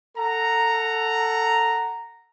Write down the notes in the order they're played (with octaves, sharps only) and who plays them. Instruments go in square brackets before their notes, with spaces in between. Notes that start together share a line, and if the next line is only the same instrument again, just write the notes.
[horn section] A4 F#5 A#5